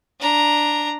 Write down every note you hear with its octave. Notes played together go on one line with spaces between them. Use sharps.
D4 A#5